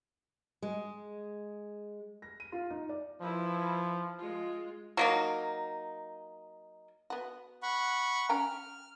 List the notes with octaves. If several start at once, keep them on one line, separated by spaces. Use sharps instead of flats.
G#3
A#6
D#7
F4
D#4
D5
F3 E4 B4
G#3 F4
F#3 A#3 D#4
B3 F#4
F#5 B5 C#6
C#4 G5 A#5 F6